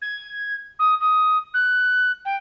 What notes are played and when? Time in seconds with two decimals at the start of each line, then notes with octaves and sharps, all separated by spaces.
0.01 G#6
0.79 D#6
1.00 D#6
1.54 F#6
2.25 G5